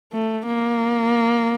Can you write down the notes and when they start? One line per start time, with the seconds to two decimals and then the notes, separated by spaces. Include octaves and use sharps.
0.13 A3
0.47 A#3